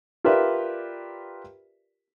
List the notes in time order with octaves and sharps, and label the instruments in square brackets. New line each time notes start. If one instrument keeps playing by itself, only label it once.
[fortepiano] F4 G4 A#4 B4 D5 E5